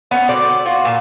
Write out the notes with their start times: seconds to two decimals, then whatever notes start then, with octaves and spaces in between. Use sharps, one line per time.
0.11 A3 B3 C#4
0.29 B2 D3 C4 D5
0.66 F4 F#4
0.85 A#2 A5